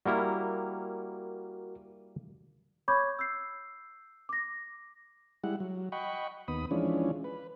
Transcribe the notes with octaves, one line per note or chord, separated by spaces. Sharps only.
G3 A#3 E4 F#4 A#4
C#5 B5 C#6 D6 G6 G#6
E6 G6 C7
D6 A#6
G3 G#3 E4 F#5
F#3
D#5 F#5 G5 B5 C#6
D#2 B3 B5 D#6
E3 F3 G#3 C#4 D4
B4